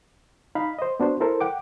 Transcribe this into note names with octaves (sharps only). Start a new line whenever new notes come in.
D#4 F5 B5
C5 D#5
B3 D4 F#4 C5
E4 A4 A#4 C5
F#5 G5 D6